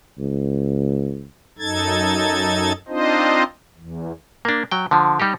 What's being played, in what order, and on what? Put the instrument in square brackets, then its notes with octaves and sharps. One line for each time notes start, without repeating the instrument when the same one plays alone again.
[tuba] C#2
[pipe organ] F#2 D#4 A4 G#6 A6
C4 D4 D#4 F4 C5 D#5
E2
[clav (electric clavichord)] A#3 D4
F#3 G5
D3 F3
G3 D#4 G4